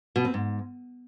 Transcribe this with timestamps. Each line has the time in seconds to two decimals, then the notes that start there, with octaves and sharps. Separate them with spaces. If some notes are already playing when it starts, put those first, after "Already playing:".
0.16 B2
0.25 C4
0.34 G#2